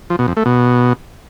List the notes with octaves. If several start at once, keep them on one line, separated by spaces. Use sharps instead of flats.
F3
B2
F2
A3
B2